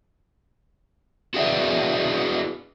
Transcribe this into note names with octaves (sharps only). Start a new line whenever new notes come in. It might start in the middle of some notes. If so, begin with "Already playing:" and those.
E4 F#4 G#4 B4 D5 E5